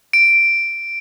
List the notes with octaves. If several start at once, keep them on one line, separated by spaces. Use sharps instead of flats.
D7